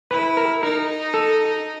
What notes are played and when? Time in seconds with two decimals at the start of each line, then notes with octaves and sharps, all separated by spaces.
0.11 E4 B4
0.37 A#4
0.63 D#4 A#4
1.14 A4